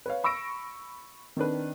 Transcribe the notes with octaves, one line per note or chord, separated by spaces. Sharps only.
B4 C#5 F5
B5 C#6 E6 A#6 D7
D#3 C4 D4 B4